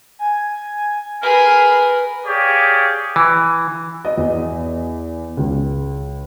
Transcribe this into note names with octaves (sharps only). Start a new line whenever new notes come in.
G#5
G#4 A#4 B4 B5
G4 G#4 C#5 D5 F5
E3
D#5
E2
C#2